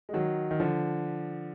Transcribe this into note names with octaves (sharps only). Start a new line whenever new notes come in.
G#3
D#3 F#3
D#3
D3 F3